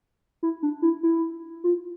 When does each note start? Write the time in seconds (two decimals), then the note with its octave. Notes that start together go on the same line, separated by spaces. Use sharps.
0.43 E4
0.63 D4
0.82 E4
1.03 E4
1.64 F4